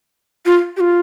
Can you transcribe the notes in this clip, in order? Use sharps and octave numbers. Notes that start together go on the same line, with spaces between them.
F4
G4
F4